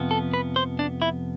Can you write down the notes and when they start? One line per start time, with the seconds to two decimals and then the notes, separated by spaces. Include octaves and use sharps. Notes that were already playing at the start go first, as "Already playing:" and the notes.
Already playing: F2 C3 F3 B3
0.11 A4
0.34 B4
0.56 C5
0.79 D4
1.02 E4